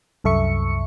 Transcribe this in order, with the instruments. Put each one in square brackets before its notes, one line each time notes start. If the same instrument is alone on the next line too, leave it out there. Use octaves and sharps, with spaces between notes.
[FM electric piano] C2 F#2 A4 E5 C#6 C#7